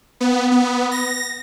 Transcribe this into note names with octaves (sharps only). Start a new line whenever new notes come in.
B3
B3
A#6